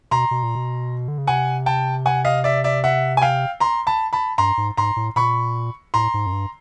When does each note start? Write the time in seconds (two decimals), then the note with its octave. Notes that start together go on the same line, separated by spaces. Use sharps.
0.11 B2 A#5 C6
0.31 B2
0.43 A#2
0.55 B2
1.08 D3
1.18 C#3
1.27 C3 F#5 G#5
1.66 G5 A5
2.06 F#5 G#5
2.25 D#5 F5
2.44 D5 E5
2.64 D5 E5
2.84 E5 F#5
3.17 G#5
3.22 F5 G5
3.60 A#5 C6
3.87 A5 B5
4.13 A5 B5
4.38 G2 A#5 C6
4.58 G#2
4.77 G#2 A#5 C6
4.96 A2
5.16 A#2 B5 C#6
5.94 A2 A#5 C6
6.14 G#2
6.26 F#2
6.32 G2